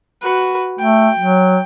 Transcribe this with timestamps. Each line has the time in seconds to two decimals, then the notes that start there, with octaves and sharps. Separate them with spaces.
0.22 F#4 B4
0.79 A3 G5
1.18 F#3